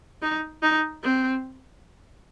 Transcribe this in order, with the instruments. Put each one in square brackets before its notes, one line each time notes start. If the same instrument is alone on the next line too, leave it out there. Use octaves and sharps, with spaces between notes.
[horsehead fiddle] D#4
D#4
C4